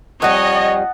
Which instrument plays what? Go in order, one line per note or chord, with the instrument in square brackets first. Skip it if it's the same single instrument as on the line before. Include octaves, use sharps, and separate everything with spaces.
[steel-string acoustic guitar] F2 G3 [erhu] C#5 [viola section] D#5 [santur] F#5 A5